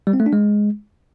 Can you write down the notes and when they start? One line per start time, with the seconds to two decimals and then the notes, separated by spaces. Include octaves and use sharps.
0.07 G3
0.13 C4
0.20 A3
0.26 D4
0.33 G#3